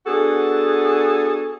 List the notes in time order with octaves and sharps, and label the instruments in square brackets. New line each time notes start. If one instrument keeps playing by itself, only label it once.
[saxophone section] B3 D4 F#4 G#4 A4